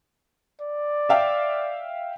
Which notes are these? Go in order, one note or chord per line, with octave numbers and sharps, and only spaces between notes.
D5
E5 F5 G5